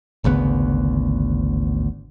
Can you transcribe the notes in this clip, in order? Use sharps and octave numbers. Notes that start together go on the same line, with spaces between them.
G#1 D2 C#3 B3